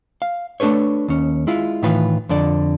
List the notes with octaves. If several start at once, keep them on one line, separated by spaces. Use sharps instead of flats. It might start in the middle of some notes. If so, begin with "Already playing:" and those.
F5
A3 D4 A4 B4 C#5
D#2 C#4
G#3 E4 F4
A2 D#3 E3 F4 B4
F2 D3 D5